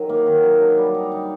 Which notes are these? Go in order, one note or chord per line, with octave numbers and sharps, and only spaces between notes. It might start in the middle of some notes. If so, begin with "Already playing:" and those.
Already playing: D#3 F#3
A#3
D#3
F#3
D4
G3
D#4
D#4